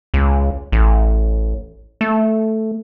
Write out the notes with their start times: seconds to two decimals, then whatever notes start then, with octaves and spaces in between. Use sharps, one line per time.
0.14 C#2
0.72 A1
2.01 A3